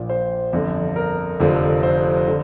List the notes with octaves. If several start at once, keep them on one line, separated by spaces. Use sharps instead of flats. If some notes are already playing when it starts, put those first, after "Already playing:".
Already playing: A#1 A#2 F3 D5
C5
G1 F2 D3
A#4
F1 F2 D3 F3
C5
D3